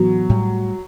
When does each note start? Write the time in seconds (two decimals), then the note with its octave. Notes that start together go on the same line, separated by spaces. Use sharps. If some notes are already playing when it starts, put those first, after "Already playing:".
Already playing: A2 E3 F#3 B3
0.29 A2 G3